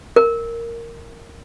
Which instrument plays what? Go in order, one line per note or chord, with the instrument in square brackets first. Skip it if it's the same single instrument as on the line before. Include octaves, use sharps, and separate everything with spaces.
[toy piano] A#4